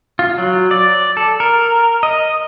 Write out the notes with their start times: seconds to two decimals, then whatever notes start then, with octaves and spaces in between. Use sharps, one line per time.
0.19 F4
0.38 F#3
0.71 D5
1.17 A4
1.40 A#4
2.03 D#5